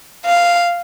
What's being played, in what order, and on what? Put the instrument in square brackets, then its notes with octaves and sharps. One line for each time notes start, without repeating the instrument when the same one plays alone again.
[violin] F5